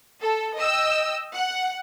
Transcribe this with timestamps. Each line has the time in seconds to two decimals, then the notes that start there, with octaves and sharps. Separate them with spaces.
0.22 A4
0.57 D#5 G5 E6
1.34 F#5